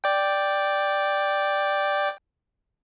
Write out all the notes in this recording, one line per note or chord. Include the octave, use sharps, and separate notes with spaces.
D5 G5